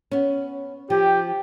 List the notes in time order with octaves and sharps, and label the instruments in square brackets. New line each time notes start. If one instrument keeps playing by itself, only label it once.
[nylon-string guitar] B3 C#4
[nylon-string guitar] F3 [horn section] G4